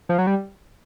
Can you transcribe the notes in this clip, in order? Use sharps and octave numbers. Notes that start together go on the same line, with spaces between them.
F3
F#3
G3